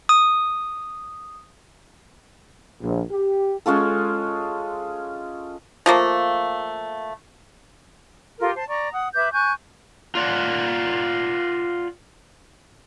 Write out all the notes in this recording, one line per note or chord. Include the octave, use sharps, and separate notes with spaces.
D#6
A#1
G4
G#3 C#4 F4 A4
F3 A3 A#3
F4 G4 A4 A#4
C5 A5
D5 A#5 C#6
F#5 D#6
B4 E5 D6 G6
G#5 C#6 F#6 G6
F4 D5 F#5